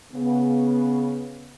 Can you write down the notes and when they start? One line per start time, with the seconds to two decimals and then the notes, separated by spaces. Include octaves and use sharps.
0.13 C#3 B3